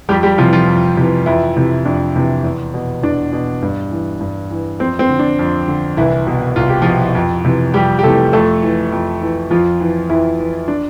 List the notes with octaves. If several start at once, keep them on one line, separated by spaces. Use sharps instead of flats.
F2 G3 G4
G3 G4
C3 E3 F3 F4
F3 F4
F2
C3 E3
F2 E3 E4
C3 E3
F2 D4
C3 E3
E2
B2
E2 D4
B2
G2
E3
G2
E3
F2 C4
C4
D3
D4
F2
D3
C2 E3 E4
B2
C2 F4
G4
B2 F3 F4
F2
C3 E3
F2 G3 G4
G4
C3 E3 A3 A4
F2 A3 A4
E3
F2
E3
F2 F3 F4
E3
F2 E3 E4
E3
D4